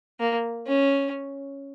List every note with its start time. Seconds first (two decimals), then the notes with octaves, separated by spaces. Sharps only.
0.20 A#3
0.67 C#4